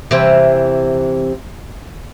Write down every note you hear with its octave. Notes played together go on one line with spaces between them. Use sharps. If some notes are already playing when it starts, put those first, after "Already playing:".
C3 E3 C4